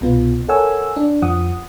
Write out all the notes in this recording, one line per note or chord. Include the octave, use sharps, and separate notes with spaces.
C2 B2 B3 F4
A4 A#4 C#5 F#5 G#5 E6
D4
F2 F3 F#5 D#6